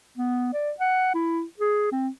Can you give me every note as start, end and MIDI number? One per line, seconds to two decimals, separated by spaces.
0.17 0.51 59
0.53 0.71 74
0.80 1.13 78
1.14 1.43 64
1.59 1.89 68
1.92 2.08 60